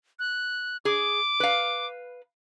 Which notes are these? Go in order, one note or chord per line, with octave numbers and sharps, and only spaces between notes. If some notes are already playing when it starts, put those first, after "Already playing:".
F#6
G#4 D6
B4 F5